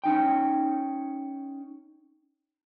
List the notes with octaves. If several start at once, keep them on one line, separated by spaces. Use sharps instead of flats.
C#4 D#4 G5